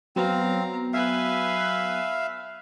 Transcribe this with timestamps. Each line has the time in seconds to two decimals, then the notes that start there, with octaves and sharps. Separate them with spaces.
0.16 F#3 B3 C4 F5 A#5
0.93 B4 E5 F5 G#5